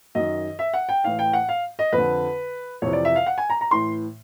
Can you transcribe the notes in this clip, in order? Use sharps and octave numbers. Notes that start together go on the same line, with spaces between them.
F#2 D#3 D#5
E5
F#5
G5
A2 E3 F5
G5
F#5
F5
D#5
F2 B4
D3
F2 C3 E3 C#5
D5
E5
F5
F#5
G#5
A#5
A#5
A2 E3 C6